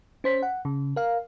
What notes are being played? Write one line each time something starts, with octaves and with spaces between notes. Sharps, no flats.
C#4 C5 B6
F#5
C#3
A#4 F5